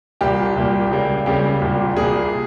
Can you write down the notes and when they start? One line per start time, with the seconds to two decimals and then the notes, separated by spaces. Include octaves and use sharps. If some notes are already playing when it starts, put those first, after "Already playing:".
0.21 C2 A#2 G3 A#3 G4
0.56 C2 A#2 G3 A#3
0.91 C#2 C#3 G3 A#3
1.26 C#2 C#3 G3 A#3 G4
1.61 C2 A#2 G3 A#3
1.96 C2 A#2 G3 A#3 G#4